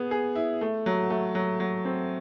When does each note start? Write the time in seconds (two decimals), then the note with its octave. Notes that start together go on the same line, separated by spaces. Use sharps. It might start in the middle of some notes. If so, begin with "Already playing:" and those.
Already playing: B3 G#4
0.11 G#4
0.35 E4
0.61 A3
0.86 F#3
1.10 A3
1.35 F#3
1.60 F#3
1.85 C4